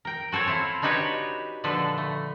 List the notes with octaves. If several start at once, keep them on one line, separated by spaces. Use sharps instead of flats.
A#4 G5
F#4 A4 C5 C#5
C4 E4 F4
D4 D#4 F#4 G4 B4 C#5
A#2 D3 F3 A4 B4
A3